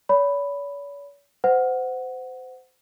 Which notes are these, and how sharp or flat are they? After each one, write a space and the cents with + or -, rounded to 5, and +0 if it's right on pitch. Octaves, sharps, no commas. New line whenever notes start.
C#5 +45 B5 +0
C5 -25 F#5 +0